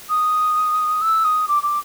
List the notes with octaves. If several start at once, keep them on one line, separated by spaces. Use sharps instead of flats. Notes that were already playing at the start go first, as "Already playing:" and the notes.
D#6
E6
D#6
D6
D6